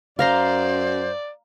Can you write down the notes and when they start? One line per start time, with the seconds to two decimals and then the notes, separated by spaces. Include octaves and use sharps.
0.19 F#2 C5 D5 F5 A#5 C6